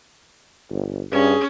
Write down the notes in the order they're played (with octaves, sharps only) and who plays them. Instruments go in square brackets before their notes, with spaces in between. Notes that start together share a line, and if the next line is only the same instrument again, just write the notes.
[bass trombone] G1
[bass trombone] G2 [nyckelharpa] C#4 [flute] G#4